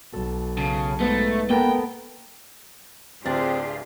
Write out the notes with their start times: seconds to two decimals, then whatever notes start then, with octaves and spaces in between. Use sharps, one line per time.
0.13 B1 A4
0.58 C#3 A5
1.00 G#2 A3 B3
1.50 A#3 B3 A4 A#4 G5
3.25 D1 D2 C4 D4 F4 G4 G#4 A6